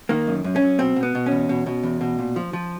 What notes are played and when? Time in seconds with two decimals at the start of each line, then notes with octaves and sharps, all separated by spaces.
0.09 D#3 A#3
0.27 F#2
0.44 F#2
0.56 C#4
0.62 F#2
0.79 B2 C4
0.96 B2
1.03 B3
1.15 B2
1.26 C#4
1.31 E2
1.49 B2
1.66 B2
1.83 E2
2.01 B2
2.19 A#2
2.36 F3
2.53 F3